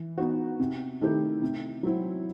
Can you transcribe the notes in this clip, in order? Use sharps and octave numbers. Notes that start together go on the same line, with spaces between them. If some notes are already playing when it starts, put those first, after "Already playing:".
Already playing: E3
B3 D#4 F#4
C3
D#3 A3 E4 G4
C3
F#3 C4 E4